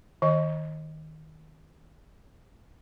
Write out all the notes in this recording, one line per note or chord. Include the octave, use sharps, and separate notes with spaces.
D#3 D#5